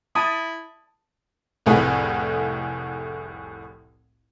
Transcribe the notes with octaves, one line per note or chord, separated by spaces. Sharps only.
E4 A5 D#6
F1 C2 A2 A3 G#4 B4